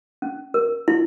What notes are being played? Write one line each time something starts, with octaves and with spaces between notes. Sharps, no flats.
C#4
A#4
E4